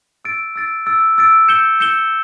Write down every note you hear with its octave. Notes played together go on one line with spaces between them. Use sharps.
E6 A6 D7
E6 A6 D7
E6 A6 D7
E6 A6 D7
G6 C#7 E7 G7
G6 C#7 E7 G7